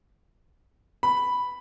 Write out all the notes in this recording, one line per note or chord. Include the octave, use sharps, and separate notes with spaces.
B5